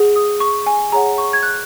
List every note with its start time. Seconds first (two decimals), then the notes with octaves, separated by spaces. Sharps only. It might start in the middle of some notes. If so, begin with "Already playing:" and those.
Already playing: G#4 F#5
0.16 D#6
0.40 C#6
0.66 G#5
0.92 G#4 C#5 F#5 A#5
1.18 C#6
1.33 G#6
1.43 F#6